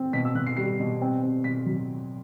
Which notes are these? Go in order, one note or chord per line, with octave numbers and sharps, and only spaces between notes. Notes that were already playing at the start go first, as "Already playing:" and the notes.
Already playing: C4
B2 B6
E6
B2 F#6
C7
G3 C7
B2
C4
C4
B2 B6
F#3